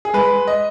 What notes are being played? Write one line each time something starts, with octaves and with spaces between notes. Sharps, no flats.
G#4
G#3 B4
G#3
D#5